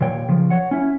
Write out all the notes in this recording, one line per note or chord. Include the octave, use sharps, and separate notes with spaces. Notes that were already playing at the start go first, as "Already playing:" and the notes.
D#2 A#2 C#5 G5
C#3 F3
C#5 F#5
C#4 E4